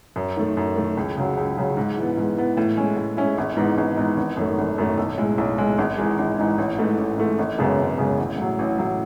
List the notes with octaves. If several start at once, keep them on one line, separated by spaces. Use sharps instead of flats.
F#2
D#3 A3
F#2
D#3 A3
C#2
C#3 F#3
C#2
C#3 F#3
G#2
E3 B3
G#2
E3 B3
A2
G#3 C#4 E4
A2
G#3 C#4 E4
G#1
G#2 E3 B3 D#4
G#1
G#2 E3 B3 D#4
G#1
F#2 D#3 A3
G#1
F#2 D#3 A3
B1
A2 G#3
B1
A2 G#3
G#1
G#2 E3 G#3 D#4
G#1
G#2 E3 G#3 D#4
A1
G#2 E3 A3
A1
G#2 E3 A3
G#1
F#2 C#3 G#3 B3
G#1
F#2 C#3 G#3 B3
A1
A2 F#3
A1
A2 F#3